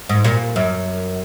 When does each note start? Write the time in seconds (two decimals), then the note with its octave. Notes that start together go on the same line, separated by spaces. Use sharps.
0.09 G#2
0.24 A#2
0.56 F#2